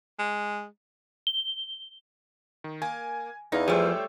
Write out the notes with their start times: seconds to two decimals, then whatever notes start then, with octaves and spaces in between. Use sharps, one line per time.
0.19 G#3
1.27 G7
2.64 D#3
2.82 A#3 G#5
3.52 E2 D#4 E4 F5
3.68 F3 G3 A3 G#4 C5 C#5 G5